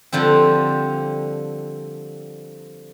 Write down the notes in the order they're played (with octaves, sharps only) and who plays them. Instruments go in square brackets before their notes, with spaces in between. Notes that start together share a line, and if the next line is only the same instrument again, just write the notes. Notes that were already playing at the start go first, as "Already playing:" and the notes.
[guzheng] D3 F3 G3 C4